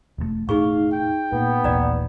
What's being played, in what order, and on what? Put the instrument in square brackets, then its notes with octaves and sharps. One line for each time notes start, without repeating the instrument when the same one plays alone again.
[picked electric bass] E1 C3 A3
[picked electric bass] E1 A2 [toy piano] D#4 G#4 C#6 [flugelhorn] F5
[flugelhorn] G5
[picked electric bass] A#2 [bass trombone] B3
[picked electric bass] D#1 A1 A#2 [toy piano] D5 A#5